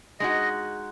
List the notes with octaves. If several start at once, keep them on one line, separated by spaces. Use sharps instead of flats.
G#3 D#4 F#4 D#5